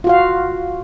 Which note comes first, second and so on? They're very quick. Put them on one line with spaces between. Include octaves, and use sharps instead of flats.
F4 F#4 F5